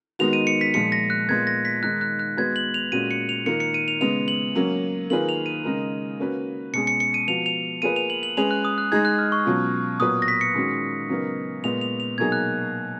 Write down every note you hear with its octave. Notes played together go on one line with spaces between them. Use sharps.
D#3 G#3 B3 D#4 F#4 F7
D#7
C#7
B6
A#2 F3 G#3 C#7
A#6
F#6
A#2 G#3 B3 G#6
A#6
B6
D#3 G#3 D#4 F#6
F#6
F#6
G#3 B3 F#4 B4 G#6
F#7
F7
A#2 G#3 C#4 F#4 D#7
C#7
F7
D#3 A#3 F4 A#4 C#7
C#7
D#7
F7
C#3 G#3 B3 F7
F#7
F#3 A#3 C#4
D#3 A#3 F4 G#4 B4 F#7
F7
D#7
C#3 G#3 D#4 A#4
A#3 C#4 F#4 B4
B2 G#3 C#4 G#4 C#7
C#7
C#7
D#7
F3 B3 F#4 F7
F7
A#3 F4 G#4 B4 D#7
F7
F#7
F#7
G#3 C#4 G#4 B4 F7
F#6
D#6
F#6
G#3 D#4 G#4 G#6
F#6
F6
C#6
B2 F#3 C#4 F4
A#2 F#3 B3 F4 B4 D#6
A#6
B6
C#7
D#3 G#3 C#4 F#4
C#3 F#3 B3 D#4 A#4
A#2 G#3 B3 F7
F7
F7
B2 F#3 A#3 D#4 G#4 G#6
F#6